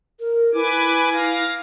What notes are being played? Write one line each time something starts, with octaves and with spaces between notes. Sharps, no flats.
A#4
E4 B4 G#5 D6
F5 A#6